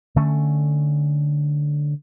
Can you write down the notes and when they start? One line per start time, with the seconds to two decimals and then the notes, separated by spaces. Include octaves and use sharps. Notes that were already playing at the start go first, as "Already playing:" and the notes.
0.16 D3 A3 C#4